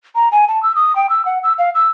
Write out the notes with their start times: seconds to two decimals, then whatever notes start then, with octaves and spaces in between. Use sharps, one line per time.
0.15 A#5
0.32 G#5
0.48 A5
0.63 E6
0.75 D#6
0.96 G5
1.10 E6
1.26 F#5
1.43 E6
1.58 F5
1.75 E6